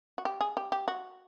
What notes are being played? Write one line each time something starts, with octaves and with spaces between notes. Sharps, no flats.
F#4
G4
G#4
G4
G4
F#4